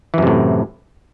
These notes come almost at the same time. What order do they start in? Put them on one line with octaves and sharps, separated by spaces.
E3 F#2 C3 A2